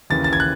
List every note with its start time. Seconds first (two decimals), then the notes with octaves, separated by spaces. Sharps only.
0.10 D#2 C#3 E3 A6
0.24 A6
0.33 G#6
0.40 F#6